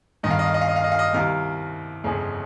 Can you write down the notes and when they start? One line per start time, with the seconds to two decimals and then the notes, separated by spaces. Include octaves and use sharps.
0.23 G1 G2 D#3 D#5
0.31 F5
0.39 D#5
0.46 F5
0.54 D#5
0.61 F5
0.69 D#5
0.76 F5
0.84 D#5
0.92 F5
0.99 D#5
1.13 C2 C3 D#3 F5
2.04 G1 F2 C#3